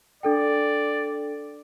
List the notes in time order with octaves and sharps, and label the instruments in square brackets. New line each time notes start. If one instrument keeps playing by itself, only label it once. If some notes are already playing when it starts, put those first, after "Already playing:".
[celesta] D4 A4 G5 [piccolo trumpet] D5